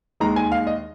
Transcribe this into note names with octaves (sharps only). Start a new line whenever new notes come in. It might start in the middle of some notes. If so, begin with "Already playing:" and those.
D#2 D#3 G#3 A#5
G#5
F5
D#5